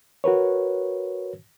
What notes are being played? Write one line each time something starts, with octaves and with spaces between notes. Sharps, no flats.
F#4 A#4 B4 C#5